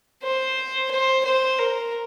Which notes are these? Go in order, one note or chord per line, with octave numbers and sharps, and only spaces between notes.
C5
C5
C5
A#4